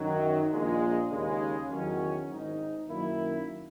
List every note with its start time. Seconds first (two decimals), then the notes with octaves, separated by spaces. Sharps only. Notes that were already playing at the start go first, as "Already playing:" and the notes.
Already playing: F#2 D#3 F#3
0.51 A#1 A#2 G#3
1.11 D#2 C#3 G#3
1.70 E2 D#3 F#3 C#4
2.29 G#1 G#2 D#3 G#3 D#4
2.89 F#2 D#3 A#3 E4